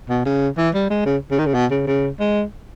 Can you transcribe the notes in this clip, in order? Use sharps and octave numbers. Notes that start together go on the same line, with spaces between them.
B2
C#3
E3
G3
G#3
C#3
C#3
D#3
C#3
B2
C#3
C#3
G#3